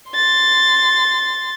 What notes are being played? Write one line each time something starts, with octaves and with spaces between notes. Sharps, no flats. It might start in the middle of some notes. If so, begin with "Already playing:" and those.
C6 A6